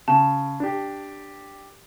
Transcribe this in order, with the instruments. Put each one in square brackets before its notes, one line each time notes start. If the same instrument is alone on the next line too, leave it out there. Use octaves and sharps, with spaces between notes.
[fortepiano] C#3 [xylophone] A5
[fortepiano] D4 G4